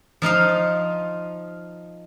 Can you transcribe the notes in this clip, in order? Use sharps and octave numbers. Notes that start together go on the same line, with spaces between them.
F3 D#4 F4 F5